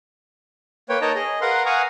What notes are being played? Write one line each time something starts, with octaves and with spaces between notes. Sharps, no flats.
A#3 B4 C#5 G5
D#4 A#4 C#5 D#5 A5 A#5
G#4 D#5
A#4 B4 F5 F#5 A#5 C6
F5 F#5 G#5 A#5 C#6 D#6